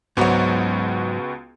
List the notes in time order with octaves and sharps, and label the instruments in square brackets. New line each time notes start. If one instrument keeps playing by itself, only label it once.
[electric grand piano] C#2 B3 F#4 [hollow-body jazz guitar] G#2 F#3